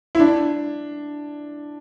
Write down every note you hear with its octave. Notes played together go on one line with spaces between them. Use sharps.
E4
D4